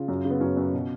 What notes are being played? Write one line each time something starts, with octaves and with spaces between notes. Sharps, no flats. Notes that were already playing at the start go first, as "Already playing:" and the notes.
Already playing: C#3 F4
F#2
C#3
B3
F#2 C#4
F#2
B2